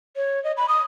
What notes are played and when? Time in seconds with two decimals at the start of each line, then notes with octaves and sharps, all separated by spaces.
0.16 C#5
0.44 D#5
0.57 B5
0.69 D#6